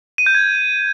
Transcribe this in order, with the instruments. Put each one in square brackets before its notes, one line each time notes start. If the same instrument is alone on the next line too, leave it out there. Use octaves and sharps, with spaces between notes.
[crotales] D#7
G6
G#6